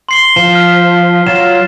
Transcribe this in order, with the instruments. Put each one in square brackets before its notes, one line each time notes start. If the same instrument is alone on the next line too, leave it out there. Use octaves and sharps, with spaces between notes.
[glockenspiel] C6 C7 G7
[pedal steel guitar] F3
[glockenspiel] F6 B6
[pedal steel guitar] F#3 F4 [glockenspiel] E7